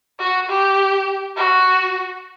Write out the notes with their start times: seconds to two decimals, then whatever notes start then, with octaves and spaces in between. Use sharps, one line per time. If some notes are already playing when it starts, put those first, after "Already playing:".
0.19 F#4
0.49 G4
1.37 F#4